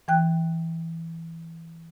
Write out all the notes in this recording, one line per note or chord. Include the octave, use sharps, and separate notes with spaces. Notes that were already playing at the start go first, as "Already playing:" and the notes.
E3 G5 F#6